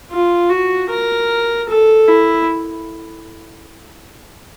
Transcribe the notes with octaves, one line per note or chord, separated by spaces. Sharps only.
F4
F#4
A#4
A4
E4